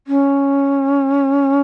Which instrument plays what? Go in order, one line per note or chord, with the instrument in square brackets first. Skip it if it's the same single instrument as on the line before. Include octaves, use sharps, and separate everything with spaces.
[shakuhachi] C#4